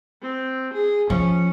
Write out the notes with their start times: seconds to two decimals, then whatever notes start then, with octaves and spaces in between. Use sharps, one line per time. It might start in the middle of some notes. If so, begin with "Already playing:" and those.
0.22 C4
0.73 G#4
1.10 F3 C#4